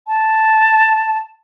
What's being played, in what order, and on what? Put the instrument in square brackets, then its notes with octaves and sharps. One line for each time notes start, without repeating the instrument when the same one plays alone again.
[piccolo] A5